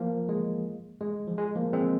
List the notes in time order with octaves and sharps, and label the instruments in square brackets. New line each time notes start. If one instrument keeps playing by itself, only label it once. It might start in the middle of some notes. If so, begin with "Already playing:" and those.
Already playing: [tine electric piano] F3 A#3
G#3
G#3
F3
G#3
F3 A#3
G#3 C4